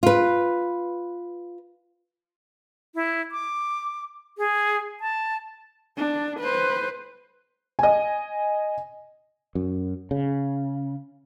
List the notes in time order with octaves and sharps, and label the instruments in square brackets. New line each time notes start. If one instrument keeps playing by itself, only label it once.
[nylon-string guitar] F4 B4
[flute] E4
D6
G#4
A5
[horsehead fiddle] D4
B4 C5
[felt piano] D#5 G#5
[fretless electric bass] F#2
C#3